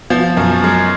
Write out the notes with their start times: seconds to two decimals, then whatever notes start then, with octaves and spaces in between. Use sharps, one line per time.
0.10 F3 B3
0.37 F#2
0.64 G#3